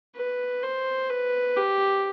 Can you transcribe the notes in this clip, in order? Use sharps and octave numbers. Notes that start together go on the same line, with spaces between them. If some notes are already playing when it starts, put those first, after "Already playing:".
B4
C5
B4
G4